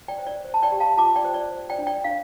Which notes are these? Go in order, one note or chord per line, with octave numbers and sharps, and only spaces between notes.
D5 G5
C5
D5
C5
A5
D5 G5
G4
F5 A5
F4 A5 D6
D5 G5
C5
D5
C5
D5 G5
D4
D5 G5
D4 F5